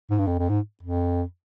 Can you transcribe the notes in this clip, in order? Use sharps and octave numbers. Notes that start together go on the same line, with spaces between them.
G#2
G2
F2
F2
G#2
F2